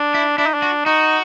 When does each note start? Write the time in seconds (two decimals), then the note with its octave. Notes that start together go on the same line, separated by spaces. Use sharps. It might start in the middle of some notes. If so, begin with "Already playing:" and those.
Already playing: D4
0.14 E4
0.38 D4 E4
0.46 D#4
0.54 D4
0.62 F#4
0.85 D#4 F#4